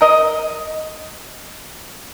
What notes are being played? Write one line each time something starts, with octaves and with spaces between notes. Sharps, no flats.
A#4 D#5